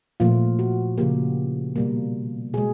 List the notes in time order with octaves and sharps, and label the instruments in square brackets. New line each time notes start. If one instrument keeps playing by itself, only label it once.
[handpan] A#2 F3 A3 F4
F#4
C#3 F3 A#3 G4
B2 G3 A#3
B2 G#3 G#4